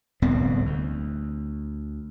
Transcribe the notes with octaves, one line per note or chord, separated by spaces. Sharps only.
D1 C2 B3 C4
D2